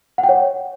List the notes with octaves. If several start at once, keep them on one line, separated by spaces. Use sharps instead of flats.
F#5
G5
C#5